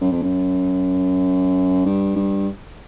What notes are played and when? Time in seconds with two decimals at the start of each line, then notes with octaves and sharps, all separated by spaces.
0.01 F#2
0.12 F2
0.22 F#2
1.85 G2
2.16 G2